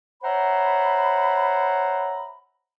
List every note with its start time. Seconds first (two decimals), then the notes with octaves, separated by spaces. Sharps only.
0.22 C5 C#5 E5 F#5 A#5 B5